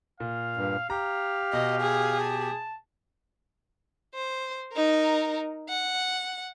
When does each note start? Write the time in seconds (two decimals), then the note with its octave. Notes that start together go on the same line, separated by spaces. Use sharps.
0.20 A#2 F5
0.57 G2
0.90 G4 F5 A#5
1.53 B2 D#5
1.81 G#4
2.19 A5
4.14 C5
4.73 D#4 A#4
5.69 F#5